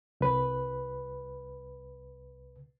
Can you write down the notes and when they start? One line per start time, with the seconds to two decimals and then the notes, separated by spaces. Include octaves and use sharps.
0.21 C2 B4